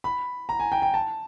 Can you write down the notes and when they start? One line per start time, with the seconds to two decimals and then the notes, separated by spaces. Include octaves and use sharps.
0.04 B5
0.49 A#5
0.59 G#5
0.72 G5
0.82 G5
0.94 A5